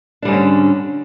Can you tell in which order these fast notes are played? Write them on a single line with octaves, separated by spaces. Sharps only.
D4 G3 G#2 D3 C#4